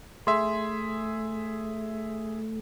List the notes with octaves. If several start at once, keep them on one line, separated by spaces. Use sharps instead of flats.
A3 G#4 E5 C6